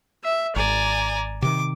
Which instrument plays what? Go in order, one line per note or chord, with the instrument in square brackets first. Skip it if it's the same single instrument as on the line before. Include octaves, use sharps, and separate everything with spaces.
[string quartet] E5
[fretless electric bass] G#1 [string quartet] D5 G#5 A#5
[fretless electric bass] C3 D#3 [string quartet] D6